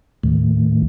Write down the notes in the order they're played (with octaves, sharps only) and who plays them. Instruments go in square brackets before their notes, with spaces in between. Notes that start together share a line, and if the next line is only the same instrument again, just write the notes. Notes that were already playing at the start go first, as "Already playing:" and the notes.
[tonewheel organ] D#2 A2